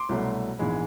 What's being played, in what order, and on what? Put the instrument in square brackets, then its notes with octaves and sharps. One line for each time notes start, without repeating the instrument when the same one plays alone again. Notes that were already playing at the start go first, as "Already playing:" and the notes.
Already playing: [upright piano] C6 D6
C2 B2 F#3 A3
A#1 G#2 E3 G#3 B3